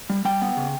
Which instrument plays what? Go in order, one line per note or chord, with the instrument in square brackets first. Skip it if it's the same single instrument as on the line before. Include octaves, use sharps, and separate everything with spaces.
[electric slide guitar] G3
G3 G5
B3
C#3